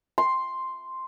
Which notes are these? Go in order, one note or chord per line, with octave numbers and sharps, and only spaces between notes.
C6